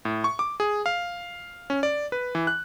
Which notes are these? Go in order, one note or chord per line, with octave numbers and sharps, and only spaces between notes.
A2
C#6
D6
G#4
F5
C#4
D5
B4
E3
F#6